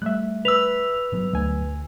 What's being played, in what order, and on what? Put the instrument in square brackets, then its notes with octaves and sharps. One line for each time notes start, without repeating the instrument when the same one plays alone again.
[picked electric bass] G3 A3 [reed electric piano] E5 F#6
[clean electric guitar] B4 [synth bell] E6 F7
[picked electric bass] G2 F#3 B3
[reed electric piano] D2 G#5